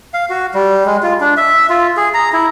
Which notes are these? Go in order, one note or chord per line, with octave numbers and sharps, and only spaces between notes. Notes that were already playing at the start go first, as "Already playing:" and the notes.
F5
F#4
G3
G#3
F4
D4
E5
F4
G#4
A#5
E4